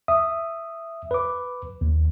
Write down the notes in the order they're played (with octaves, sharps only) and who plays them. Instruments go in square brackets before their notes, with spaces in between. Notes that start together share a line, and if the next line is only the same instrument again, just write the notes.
[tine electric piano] E5 D#6
B4 D6
D#2